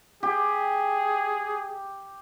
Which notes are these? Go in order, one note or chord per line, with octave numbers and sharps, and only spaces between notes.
G4 G#4